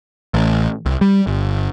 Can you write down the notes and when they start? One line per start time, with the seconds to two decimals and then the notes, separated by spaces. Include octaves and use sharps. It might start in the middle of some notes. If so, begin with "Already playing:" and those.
0.34 A1
0.86 C2
1.01 G3
1.27 G1